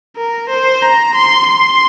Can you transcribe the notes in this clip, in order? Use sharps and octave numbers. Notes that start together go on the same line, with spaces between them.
A#4
C5
A#5
C6
C6